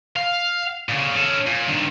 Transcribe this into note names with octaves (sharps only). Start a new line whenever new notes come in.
F5
A#2 C#3
C#4 A4
A#2
G2 D#3